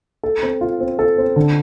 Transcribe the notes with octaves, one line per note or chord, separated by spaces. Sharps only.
A4
C4
F4
C4
A4
C4
D3